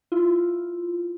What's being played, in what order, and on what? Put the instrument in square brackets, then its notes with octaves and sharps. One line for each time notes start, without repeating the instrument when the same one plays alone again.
[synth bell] E4 F4